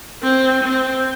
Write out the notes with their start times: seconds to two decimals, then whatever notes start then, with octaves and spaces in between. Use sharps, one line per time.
0.23 C4
0.64 C4